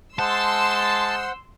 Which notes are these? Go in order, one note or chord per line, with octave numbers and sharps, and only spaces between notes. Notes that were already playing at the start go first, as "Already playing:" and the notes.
G#3 C5 F#5 A5 C6 E6